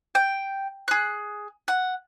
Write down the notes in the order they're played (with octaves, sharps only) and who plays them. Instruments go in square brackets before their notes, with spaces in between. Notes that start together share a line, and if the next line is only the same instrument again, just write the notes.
[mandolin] G5
G#4 F#6
F#5